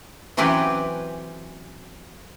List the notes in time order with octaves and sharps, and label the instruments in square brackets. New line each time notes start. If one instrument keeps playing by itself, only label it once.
[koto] E3 F#3 C4 C#4 G4 B4